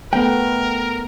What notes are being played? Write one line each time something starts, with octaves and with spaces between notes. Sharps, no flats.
A3 B3 A#4 B4 G5